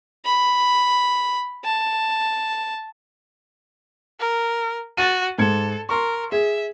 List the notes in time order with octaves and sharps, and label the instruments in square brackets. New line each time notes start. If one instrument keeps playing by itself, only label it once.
[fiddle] B5
A5
[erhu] A#4
[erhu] F#4 [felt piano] A6 D#7
[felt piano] G#2 G#6 C#7 [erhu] A4
[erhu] A#4 [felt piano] C6 C#6
[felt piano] G#4 [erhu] E5